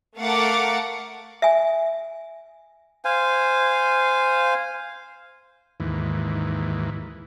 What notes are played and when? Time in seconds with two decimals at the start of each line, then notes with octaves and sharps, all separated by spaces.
0.19 A3 A#4 F5 F#5 D6 A6
1.42 E5 G#5
3.05 C5 F5 G#5
5.80 D#2 G#2 E3